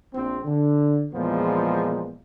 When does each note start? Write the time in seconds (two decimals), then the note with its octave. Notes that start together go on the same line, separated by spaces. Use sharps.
0.14 A#1 C4
0.44 D3
1.14 E2 A#2 F3 G#3 B3